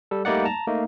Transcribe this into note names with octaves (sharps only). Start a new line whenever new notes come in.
G3 A4
G3 A3 A#3 D#4 D5 F#5
A5 A#5
A3 A#3 D#4